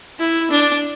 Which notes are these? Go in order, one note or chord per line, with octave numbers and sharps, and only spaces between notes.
E4
D4